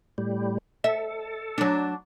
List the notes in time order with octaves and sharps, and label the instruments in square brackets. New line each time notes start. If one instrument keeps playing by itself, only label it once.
[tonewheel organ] A2 G3
[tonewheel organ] A4 [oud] E5
[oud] F#3 D4